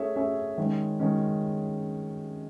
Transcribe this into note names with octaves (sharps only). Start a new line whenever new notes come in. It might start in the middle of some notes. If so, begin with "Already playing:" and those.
Already playing: A3 C#4 G#4 C#5 E5
A3 C#4 G#4 C#5 E5
D#3 G#3 C#4
D#3 G#3 C#4